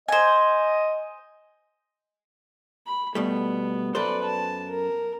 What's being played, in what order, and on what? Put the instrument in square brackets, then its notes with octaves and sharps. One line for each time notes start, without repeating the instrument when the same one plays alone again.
[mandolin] C5 G#5 [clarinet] D#5
[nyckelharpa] B5
[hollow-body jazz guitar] B2 G3 A3 [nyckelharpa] B3
[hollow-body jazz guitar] F#2 A4 C5 [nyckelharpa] B4 D5
[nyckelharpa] A5
A#4